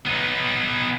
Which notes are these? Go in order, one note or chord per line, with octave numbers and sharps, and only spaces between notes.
B3 D#4